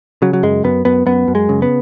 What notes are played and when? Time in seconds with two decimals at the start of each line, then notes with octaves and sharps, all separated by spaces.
0.22 C#3 F#3
0.33 F#3
0.43 F#2 G#3
0.64 F#2 B3
0.85 F#2 B3
1.06 F#2 B3
1.28 F#2
1.35 G#3
1.49 C#3
1.62 B3